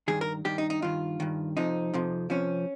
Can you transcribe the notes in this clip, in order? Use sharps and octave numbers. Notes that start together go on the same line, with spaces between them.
G2 D#3 G#4
A#4
G2 D#3 G4
D#4
D#4
G2 D#3 F4
G2 D#3
F2 C3 F3 D#4
F2 C3 F3
F2 C3 F3 C#4